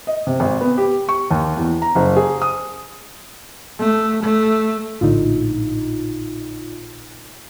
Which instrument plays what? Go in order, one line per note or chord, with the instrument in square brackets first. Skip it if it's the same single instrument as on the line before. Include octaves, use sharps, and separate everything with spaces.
[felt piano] D#5
C3
G#1
B3
G4
C#6
D#2
E2
A#5
F#1
G#4
D#6
[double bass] A3
A3
[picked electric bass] A#1 A2 D3 [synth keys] D#4 F4